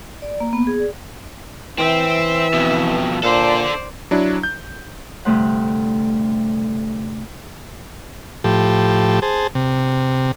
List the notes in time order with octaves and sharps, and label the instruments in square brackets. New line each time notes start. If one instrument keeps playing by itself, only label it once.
[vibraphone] D5
A#3
B3
G#4
D5
[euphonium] E3 [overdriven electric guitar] C4 [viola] E5
[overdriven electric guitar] F2 B2
[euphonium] A#2 [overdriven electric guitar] D4 A4 [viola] C5 D5
[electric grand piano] F#3 D4 E4
G6
[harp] D2 G2 C3 A3 C5 F#5
[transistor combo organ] A2 F3 G4 A4
G#4 C5 A5
C3